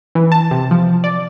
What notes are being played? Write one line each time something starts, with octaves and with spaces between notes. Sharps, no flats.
E3
A5
C3
F3
D5